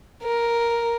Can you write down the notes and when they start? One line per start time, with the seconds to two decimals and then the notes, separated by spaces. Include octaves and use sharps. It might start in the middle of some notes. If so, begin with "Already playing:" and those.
0.23 A#4